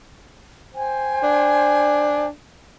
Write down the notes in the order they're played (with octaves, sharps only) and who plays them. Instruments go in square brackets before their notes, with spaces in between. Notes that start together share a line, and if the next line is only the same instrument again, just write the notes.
[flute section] C5 G5 G#5
[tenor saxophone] D4